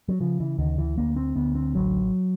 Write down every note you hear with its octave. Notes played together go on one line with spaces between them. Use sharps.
F#3
C#3 F3
E3
D2 D#3
E3
D2 A#3
C4
D2 B3
C4
A1 F#3